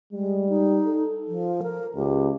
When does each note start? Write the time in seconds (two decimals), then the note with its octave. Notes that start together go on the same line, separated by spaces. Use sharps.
0.13 G3 G#3
0.49 D#4
0.86 A4
1.28 F3
1.63 A#4
1.96 C#2 G4